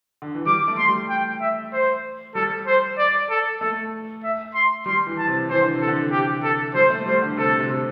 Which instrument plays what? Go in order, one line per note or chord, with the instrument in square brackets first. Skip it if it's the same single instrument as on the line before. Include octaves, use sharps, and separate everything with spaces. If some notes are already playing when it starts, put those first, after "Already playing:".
[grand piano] D3
E3
[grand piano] G3 [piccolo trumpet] D6
[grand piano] A3
[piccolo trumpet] C6
[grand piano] G3
[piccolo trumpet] G5
E5
C5
[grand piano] G3 [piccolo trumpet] A4
[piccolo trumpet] C5
D5
A4
[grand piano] A3 [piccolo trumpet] A4
[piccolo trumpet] E5
C6
[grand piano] G3 [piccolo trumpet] C6
[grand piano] E3
[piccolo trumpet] A5
[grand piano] C3
[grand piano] E3 [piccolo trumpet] C5
[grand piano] D3
C3
[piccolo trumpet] A4
[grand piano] D3
[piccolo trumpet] G4
A4
[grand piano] G3 [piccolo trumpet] C5
[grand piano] A3
[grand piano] G3 [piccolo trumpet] C5
[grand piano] D3
[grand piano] C3 [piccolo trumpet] A4
[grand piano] C3
C3